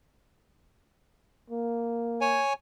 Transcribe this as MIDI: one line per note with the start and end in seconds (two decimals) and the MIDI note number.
1.50 2.42 58
2.21 2.53 73
2.21 2.53 80